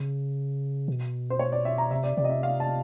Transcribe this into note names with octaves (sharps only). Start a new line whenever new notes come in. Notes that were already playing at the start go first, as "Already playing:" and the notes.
Already playing: C#3
B2
C5
C#5
D5
E5
A#5
C3 E5
D5
C3 D5
D#5
E5
F5
A5